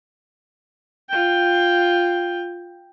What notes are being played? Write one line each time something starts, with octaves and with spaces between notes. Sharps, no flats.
F4 G5